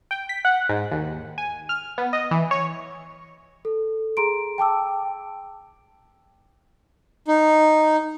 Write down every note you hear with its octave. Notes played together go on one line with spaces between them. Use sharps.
G5
B6
F#5
G#2
D#2
G#5
F6
B3
D#5
E3
C#5
A4
G#4 A#5 C6 D7
G5 A5 D6 E6
D#4